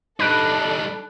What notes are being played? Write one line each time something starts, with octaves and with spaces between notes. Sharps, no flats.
G3 D4 D#4 A4 B5 F#6 D7